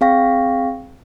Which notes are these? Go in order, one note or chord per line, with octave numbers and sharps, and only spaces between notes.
C4 G#4 F5 G5 C#6 A#6